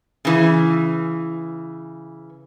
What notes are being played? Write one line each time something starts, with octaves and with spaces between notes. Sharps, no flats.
C#3 E3